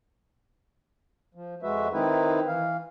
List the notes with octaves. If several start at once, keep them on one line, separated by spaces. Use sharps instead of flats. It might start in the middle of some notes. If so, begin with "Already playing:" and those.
F3
F2 G#3 F#4 B4 E5
D#3 C4 D#4 E4 B4
E3 F5